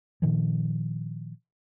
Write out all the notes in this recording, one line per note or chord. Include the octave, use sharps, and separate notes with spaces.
A#2 D#3 F3